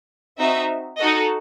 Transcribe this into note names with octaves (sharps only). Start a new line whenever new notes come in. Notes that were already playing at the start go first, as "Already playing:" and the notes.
C4 D#4 F#4 E5
D#4 F#4 A4 D#5